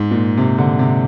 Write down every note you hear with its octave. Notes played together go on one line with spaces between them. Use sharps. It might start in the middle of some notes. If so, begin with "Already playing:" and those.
Already playing: G#2
A#2
C3
D3
C3